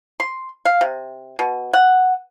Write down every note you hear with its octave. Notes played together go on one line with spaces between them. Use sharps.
C6
F5
C3
B2
F#5